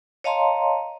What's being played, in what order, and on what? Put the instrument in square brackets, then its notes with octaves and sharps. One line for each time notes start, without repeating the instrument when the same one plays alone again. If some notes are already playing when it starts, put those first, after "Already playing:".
[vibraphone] C#5 D#5 F5 A5 A#5 C6